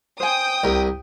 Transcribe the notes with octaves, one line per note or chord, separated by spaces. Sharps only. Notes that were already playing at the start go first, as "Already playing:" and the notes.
C5 G5 G#5 D#6
C2 A#4